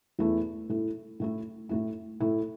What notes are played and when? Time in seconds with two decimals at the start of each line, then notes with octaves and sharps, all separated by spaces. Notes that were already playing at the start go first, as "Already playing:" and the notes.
0.19 E2 E3 A3 E4
0.69 A2 A3 E4
1.20 A2 A3 E4
1.69 A2 A3 E4
2.20 A2 A3 E4